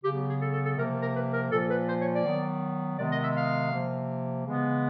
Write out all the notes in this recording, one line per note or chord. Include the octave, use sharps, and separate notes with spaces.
C#3 F#3 B3 G4
G#4
A4
A4
A4
C3 F3 A#3 A#4
A#4
B4
A#4
A#2 F3 A#3 A4
B4
C5
C#5
D5
D#3 F#3 B3
C3 D#3 G#3 B3 D5
D#5
E5
F5
C3 F3 A#3
C#3 E3 G#3 B3